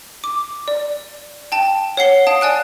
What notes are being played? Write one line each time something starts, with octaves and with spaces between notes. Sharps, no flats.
D6
D5
G5 A5
C#5 F#5 C7 G7
F5 A5 D#6 D7
D5 G#5 F#6 D7